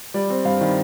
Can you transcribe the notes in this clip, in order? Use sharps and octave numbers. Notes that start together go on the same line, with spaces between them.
G3 D5
C4
G2 F5
D#3